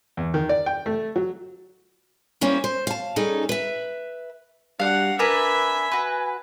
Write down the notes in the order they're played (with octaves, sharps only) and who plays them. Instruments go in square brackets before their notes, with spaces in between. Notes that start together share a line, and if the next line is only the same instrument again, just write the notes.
[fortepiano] E2
D#3
D5
G5
A3
F#3
[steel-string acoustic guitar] G3 A#3 C#4 E4 C5
C5
F5 A5
G3 C#4 D#4 G#4 A4
B4 E5
[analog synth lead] G3 [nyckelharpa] D4 F#5 [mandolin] F#4 F5
[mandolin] D4 A#4 B4 [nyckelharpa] E5 B5 [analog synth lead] G#5
[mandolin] F#4 B4